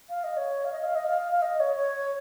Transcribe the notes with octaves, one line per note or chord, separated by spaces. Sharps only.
F5
D#5
C#5
F5
D#5
F5
D#5
F5
F5
D#5
C#5
C#5